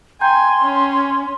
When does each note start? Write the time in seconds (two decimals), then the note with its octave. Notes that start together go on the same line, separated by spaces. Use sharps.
0.21 G5 G#5 A#5 C6 G6
0.62 C#4